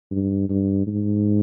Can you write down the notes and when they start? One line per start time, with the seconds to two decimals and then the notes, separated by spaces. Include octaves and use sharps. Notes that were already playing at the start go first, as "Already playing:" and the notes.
0.11 G2
0.49 G2
0.87 G#2